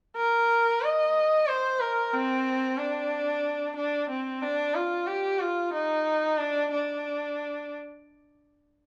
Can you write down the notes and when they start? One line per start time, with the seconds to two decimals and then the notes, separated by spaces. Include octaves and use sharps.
0.16 A#4
0.82 D#5
1.47 C5
1.80 A#4
2.13 C4
2.78 D4
3.76 D4
4.10 C4
4.42 D4
4.75 F4
5.07 G4
5.40 F4
5.73 D#4
6.38 D4
6.72 D4